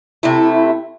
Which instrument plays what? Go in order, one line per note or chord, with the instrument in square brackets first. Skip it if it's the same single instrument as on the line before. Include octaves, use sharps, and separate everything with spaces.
[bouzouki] C3 A3 [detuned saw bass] E4